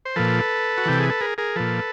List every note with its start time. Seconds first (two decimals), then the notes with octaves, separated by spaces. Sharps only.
0.05 C5
0.16 A#2 F3 A4 B4
0.77 F#4
0.86 C3 E3 G4
1.00 G#4
1.10 A4
1.21 G#4 A#4
1.38 G#4 A#4
1.56 A#2 F3 A4 B4